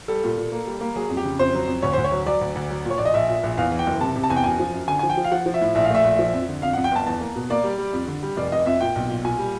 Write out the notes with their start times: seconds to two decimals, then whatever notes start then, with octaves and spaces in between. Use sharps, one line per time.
0.08 G3 A4
0.24 A#2
0.37 A#2
0.52 A#3
0.67 G3
0.81 A#3
0.96 F#3 G#4
1.10 F2
1.17 G4
1.25 C#3
1.39 F2 C5
1.54 F#3
1.68 F2
1.82 D2 C#5
1.93 D2 C5
2.04 C#5
2.12 F#3
2.26 F#3 D5
2.41 D2
2.55 D2
2.71 F#3
2.85 A#2
2.90 C#5
2.98 A#1 D5
3.05 D#5
3.14 A#1 E5
3.29 A#2
3.43 A#1
3.57 E2 F5
3.72 E3
3.79 G5
3.86 F#1
4.01 C3 A5
4.16 C3
4.23 A5
4.30 E2 G#5
4.36 G5
4.44 F#2 G#5
4.59 F3
4.73 F#2
4.88 D3 G#5
4.99 F3 G#5
5.10 G5
5.17 F3
5.24 F5
5.32 F3 F#5
5.46 F3
5.54 E5
5.61 A2
5.75 A#1 E5
5.85 F5
5.90 A3 E5
6.04 A#1
6.19 F3
6.33 F2
6.48 D3
6.62 F2 F5
6.73 F#5
6.77 F2
6.84 G5
6.91 G1 A5
7.06 E2 A5
7.21 A#3
7.36 B2
7.50 A#3 D5
7.64 G3
7.78 G3
7.93 F2
8.08 D3
8.23 G3
8.37 F1 D5
8.52 F1 D#5
8.66 F2 E5
8.81 A#2 G5
8.96 B1
9.09 A#2
9.24 A#2 G#5
9.39 G3